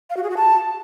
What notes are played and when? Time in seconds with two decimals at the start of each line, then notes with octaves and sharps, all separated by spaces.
0.10 F5
0.17 F#4
0.23 G#4
0.30 F#4
0.37 A5